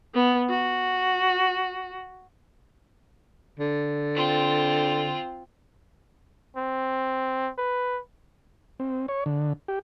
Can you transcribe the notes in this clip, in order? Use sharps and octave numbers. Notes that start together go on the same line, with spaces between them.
B3
F#4
D3
C4 F4
C4
B4
C4
C#5
D3
G4